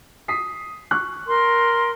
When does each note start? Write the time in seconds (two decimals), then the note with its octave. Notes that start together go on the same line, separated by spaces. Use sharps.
0.28 D#6 B6 C7
0.91 C#6 F#6
1.28 A#4 C6